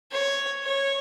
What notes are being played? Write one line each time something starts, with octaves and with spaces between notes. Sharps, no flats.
C#5
C#5